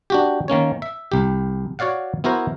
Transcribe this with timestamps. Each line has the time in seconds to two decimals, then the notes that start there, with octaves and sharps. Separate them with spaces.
0.10 D4 F#4 G4
0.48 D#3 A#3 C#4 C#5
0.82 E5
1.12 C2 G4
1.79 F#4 C#5 D5 F5 F#5
2.24 B3 E4 F#4 A#4 C5